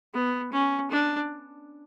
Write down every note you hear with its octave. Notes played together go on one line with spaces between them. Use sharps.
B3
C#4
D4